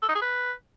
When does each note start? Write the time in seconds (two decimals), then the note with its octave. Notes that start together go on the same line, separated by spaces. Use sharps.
0.02 A4
0.09 D#4
0.15 G#4
0.21 B4